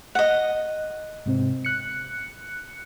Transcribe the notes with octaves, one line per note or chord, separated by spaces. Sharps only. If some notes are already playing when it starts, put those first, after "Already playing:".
D#5 F#5
G#2 C3 C4
F#6 C#7